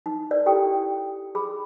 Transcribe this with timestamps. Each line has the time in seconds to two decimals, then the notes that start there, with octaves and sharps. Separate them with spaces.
0.06 D#4
0.31 A#4 D5
0.46 E4 G4 A4 G5
1.35 G#4 B5